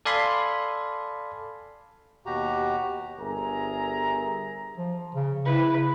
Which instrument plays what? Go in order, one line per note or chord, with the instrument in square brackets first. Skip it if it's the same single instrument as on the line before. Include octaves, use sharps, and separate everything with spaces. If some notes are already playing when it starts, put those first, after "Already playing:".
[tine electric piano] A4 D5 F5 G#5 B5 C6
[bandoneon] D#2 B2 F#4 G4 A#5
[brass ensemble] G1 G#4 A#4 E5 G#5 A#5
[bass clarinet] F3
C#3
[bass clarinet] C#3 [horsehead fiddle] E4 B4